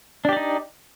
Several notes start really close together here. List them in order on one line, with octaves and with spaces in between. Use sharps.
D4 G4 D5 D#4